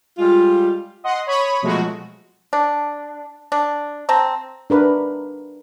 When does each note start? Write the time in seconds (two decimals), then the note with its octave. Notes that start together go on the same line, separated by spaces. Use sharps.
0.18 G3 G#3 F4
1.04 D#5 F#5 C6
1.26 C#5 B5 C#6 D#6
1.62 B2 F3 F#3 G#3 A3 F#4
2.53 D4
3.52 D4
4.09 C4 A5 A#5
4.70 D4 A#4 B4